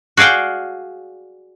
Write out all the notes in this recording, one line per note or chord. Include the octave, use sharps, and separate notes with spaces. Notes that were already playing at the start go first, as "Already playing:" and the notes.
F#4 G#4 D5 F5 G5